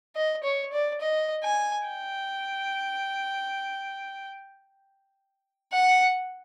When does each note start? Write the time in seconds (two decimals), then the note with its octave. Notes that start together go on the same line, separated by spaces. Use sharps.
0.15 D#5
0.43 C#5
0.72 D5
1.00 D#5
1.44 G#5
1.87 G5
5.72 F#5